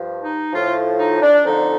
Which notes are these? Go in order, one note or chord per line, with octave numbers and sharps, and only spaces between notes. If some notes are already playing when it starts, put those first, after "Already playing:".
Already playing: G2 F3
D#4
A2 F3 F4
D#4
D4
F2 D3 F3 D#4